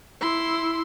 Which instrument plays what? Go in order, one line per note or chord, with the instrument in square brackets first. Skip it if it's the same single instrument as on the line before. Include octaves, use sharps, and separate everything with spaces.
[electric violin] E4 C6